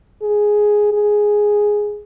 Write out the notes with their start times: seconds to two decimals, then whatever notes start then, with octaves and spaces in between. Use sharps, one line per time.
0.22 G#4
0.93 G#4